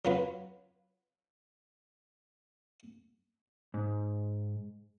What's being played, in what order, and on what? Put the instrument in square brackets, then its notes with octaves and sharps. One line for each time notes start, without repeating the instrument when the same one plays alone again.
[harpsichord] F#3 F4 B4
[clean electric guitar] G#2